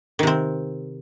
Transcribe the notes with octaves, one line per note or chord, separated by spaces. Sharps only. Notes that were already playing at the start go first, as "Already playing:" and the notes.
C3 D#3 C4